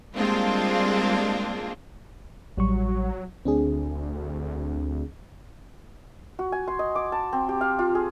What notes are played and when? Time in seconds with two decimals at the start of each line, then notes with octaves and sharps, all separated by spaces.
0.16 G3 G#3 A#3 C4 D4 F4
2.57 A1 F#3 G3 C#6
3.45 D2 C4 D4 G#4
6.39 F#4
6.52 G#5
6.68 C6
6.79 D#5
6.95 D6
7.12 A5
7.33 C4
7.49 G4
7.61 F5
7.79 F4
7.95 G#4